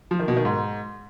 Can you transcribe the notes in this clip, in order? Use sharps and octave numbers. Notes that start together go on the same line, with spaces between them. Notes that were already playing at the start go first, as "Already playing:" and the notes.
F3
D#3
B2
D#3
G#2